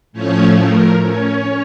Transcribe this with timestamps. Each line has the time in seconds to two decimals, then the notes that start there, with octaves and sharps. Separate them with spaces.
0.13 A2 F3 A3 C#4 C#5
0.58 A#4
1.03 C#4 C#5